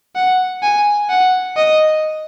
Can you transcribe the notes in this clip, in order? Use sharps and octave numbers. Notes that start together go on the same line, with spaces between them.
F#5
G#5
F#5
D#5